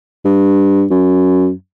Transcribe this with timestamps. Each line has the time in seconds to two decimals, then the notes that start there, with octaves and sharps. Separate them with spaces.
0.25 G2
0.91 F#2